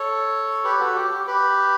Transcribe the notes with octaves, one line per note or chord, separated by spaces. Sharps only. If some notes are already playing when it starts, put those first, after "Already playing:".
Already playing: A4 C#5
G4 B4
F#4 A4
G4
G4
G4 B4